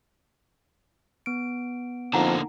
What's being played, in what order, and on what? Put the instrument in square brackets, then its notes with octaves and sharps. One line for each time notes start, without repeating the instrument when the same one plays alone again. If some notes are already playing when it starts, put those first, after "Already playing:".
[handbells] B3 D7
[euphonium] F2 [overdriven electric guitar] D3 A#3 [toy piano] D#4 F#5 A#5